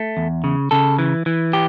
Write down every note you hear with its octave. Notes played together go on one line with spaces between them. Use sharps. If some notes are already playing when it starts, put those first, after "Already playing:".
Already playing: A3
E2
C#3
C#3 A4
E3
E3
G4